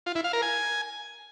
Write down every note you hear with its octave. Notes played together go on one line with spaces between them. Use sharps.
F4
E4
F5
A#4
G#5